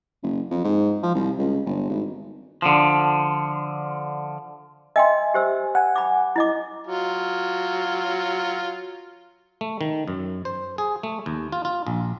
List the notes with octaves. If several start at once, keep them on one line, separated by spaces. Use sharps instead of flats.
F#1
F2
G#2
F3
C2
C#2
G1
G#1
D3 F3
D#5 E5 G5 G#5 C6
G4 C5 E6
F#5 G#5
B5 D6
E4 D#5 D6
F#3 F4
A3
D#3
F#2
C5
G#4
A3
D#2
F4
F4
A#1